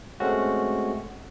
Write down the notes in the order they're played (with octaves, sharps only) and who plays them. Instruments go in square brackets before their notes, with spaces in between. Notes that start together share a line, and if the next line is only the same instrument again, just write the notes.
[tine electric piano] G#3 A3 C4 C#4 F#4